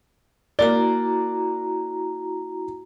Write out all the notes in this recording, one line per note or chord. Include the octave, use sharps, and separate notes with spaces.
A#3 E4 F#4 D5 A#5